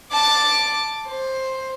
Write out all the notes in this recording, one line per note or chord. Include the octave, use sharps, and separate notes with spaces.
A5 D6
C5